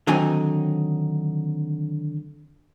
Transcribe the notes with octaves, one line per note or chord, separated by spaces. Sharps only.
D3 D#3 F#3 C4 D#4 G#5